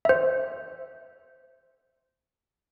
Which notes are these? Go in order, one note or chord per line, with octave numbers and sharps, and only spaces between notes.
C5 E5